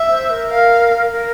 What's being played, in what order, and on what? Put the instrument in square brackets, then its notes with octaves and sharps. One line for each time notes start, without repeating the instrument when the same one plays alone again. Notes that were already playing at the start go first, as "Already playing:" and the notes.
Already playing: [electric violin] E5
[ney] C5
A#4
[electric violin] F5
[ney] A#4